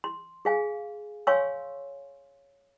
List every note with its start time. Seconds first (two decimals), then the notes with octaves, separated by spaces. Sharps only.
0.04 C6
0.45 G#4 F5 G#5
1.27 C#5 F5 G#5 C6 C#6 E6